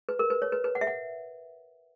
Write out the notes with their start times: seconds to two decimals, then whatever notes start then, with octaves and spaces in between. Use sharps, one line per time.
0.09 B4
0.19 A#4
0.30 B4
0.42 C#5
0.52 B4
0.64 B4
0.75 F#5
0.81 E5
0.87 F#5